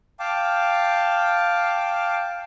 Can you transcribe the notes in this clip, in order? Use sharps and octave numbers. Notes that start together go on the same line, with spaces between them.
F5 G5 A5 D6